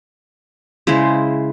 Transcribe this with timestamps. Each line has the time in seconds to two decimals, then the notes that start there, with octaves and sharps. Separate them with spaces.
0.87 C#3 G#3 E4 C5